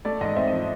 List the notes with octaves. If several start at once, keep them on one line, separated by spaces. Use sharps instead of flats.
A3 D5
G#2 D#5
C4 E5
D#5
F3